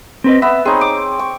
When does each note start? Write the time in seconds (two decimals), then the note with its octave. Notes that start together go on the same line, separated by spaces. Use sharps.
0.24 C4 B4 D#5
0.42 B3 E5
0.65 C4 D#4 G#4 C#5
0.81 D6
1.19 C#6